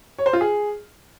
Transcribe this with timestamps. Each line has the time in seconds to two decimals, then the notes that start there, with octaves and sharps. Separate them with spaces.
0.18 C#5
0.26 C5
0.33 F4
0.41 G#4